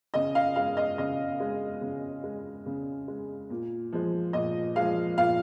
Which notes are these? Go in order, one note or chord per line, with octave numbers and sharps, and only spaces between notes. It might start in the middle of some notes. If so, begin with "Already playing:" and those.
C#3 D#5
F5
G#3 F5
D#5
C#3 D#5
G#3
C#3
G#3
C#3
G#3
A#2
F3 G#3
A#2 D#5
F3 G#3 F5
A#2 F5